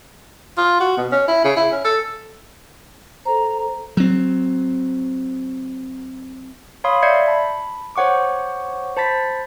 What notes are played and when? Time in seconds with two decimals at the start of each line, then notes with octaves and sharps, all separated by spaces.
0.57 F4
0.80 F#4
0.97 B2
1.12 C#4
1.28 E4
1.44 C#3
1.57 E4
1.72 C#4
1.85 A4
3.25 A4 C5 A#5
3.97 F#3 C4
6.84 C#5 F5 B5 C6 D#6
7.02 D5 E5 G6 G#6 C7 C#7
7.27 A5 B5
7.96 C5 C#5 F#5 C#6 D6
8.97 C5 A5 B5 A6 B6